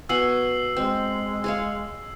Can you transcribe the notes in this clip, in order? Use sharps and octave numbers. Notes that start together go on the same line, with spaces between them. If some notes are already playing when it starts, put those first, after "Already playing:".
B2 F#5 G#5 E6 C7 F#7
G#3 C4
G#4 C#5 F5